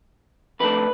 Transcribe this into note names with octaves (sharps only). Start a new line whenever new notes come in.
F2 D3 A3 D4 B4